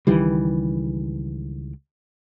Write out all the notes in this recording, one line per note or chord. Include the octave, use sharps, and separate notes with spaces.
C#2 D#3 E3 G3